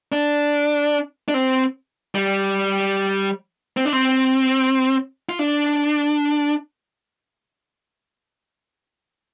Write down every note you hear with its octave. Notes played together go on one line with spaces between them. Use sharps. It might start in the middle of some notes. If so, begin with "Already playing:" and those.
D4
D4
C4
G3
C4
D4
C4
F4
D4